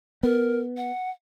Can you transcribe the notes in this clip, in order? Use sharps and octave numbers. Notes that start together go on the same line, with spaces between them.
B3 A#4
F#5